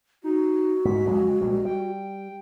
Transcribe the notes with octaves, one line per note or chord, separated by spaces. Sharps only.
D#4 F#4
G#2 B6
F2 C#3 F#3 G#3
A#1 G3
G3 G5